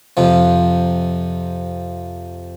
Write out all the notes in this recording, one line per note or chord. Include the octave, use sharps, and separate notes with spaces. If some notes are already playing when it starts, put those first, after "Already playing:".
F2 C3 F3